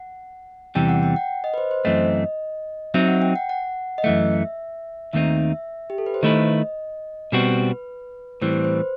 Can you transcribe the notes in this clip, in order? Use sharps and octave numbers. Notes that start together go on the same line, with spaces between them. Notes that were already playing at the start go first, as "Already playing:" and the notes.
Already playing: F#5
E2 C3 E3 G3 G5
F#5
G5
F#5
D#5
B4
C5
C5
F#2 E3 A3 C4 D#5
F#3 C4 D#4 E5
F#5
G5
F#5
F#5
D#5
F#2 E3 A3 E5
D#2 D#3 A3 C4 D#4 E5
G4
A4
B4
C5
D#3 A3 E4 B4 D#5
B2 G3 C4 F#4 B4
A2 E3 G3 C4 C5
B4
C5